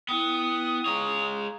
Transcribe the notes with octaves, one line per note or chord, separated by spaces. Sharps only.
B3 E4 G5 D#6
G#3 C#5 F5 A#5